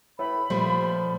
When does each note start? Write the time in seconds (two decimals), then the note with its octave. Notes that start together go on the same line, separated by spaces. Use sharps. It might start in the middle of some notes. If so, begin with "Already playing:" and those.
0.19 A2 A4 B4 B5
0.50 A#2 F3 G3 A3 F4 C5